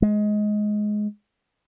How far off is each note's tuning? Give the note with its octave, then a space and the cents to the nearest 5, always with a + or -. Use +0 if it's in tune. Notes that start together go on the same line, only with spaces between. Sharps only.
G#3 +15